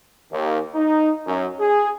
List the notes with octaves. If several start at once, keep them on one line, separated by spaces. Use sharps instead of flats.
D#2
D#4
F#2
G#4